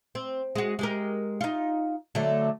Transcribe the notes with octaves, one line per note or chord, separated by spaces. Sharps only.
C4
G#3 F#4
G#3 G4 A#4
D#4 F4
D3 F#3 A3